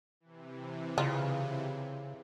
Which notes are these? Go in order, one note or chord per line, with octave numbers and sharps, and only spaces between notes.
C3 E3
C#3 F4